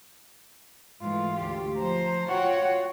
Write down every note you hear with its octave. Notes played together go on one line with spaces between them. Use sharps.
G#2 E3 A3 F4
D2 G4
F3 C5 A#5
F4 F#4 C#5 F#5 G5